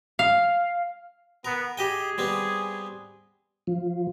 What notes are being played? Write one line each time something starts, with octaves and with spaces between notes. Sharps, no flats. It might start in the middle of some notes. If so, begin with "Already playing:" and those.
F5
B3 A#4
G4 G#4 D#5 G5
G3 B3 C4
F3